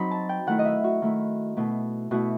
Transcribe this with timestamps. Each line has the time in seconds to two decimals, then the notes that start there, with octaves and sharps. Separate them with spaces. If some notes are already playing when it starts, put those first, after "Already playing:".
Already playing: F#3 C4 D#4 B5
0.11 A5
0.29 G5
0.47 D#3 A3 E4 F#5
0.59 D#5
0.65 E5
0.84 F#4
1.02 D#3 A3 E4
1.57 B2 A3 E4
2.11 B2 A3 E4 F#4